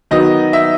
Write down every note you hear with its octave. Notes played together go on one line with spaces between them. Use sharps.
D#3 F#3 B3 D#4 D#5
E5